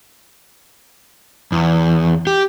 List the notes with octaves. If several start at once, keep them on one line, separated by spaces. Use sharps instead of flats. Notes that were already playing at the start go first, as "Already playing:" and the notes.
E2
G4